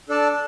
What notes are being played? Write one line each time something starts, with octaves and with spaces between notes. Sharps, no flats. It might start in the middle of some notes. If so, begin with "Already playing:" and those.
D4 A4 D5 A5